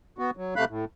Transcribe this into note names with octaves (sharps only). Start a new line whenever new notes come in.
B3 F#4
F#3
C3 A3 F5 B5 F#6
A2